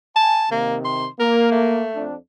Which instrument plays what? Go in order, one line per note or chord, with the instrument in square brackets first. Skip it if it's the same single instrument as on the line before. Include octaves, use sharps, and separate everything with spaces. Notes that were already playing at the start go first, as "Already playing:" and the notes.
[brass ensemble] G#5 [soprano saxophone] A5
[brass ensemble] C3 D#3 [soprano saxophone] A#3
[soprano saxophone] C6
[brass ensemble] A#3 [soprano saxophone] A#4
[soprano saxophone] A3
[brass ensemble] F2 D4